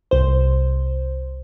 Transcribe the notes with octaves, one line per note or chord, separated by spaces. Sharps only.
C2 C5